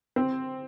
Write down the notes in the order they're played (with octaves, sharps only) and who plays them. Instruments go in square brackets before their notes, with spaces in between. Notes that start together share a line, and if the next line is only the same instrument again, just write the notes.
[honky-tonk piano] C4